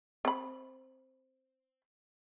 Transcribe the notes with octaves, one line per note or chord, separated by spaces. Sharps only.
C4 B5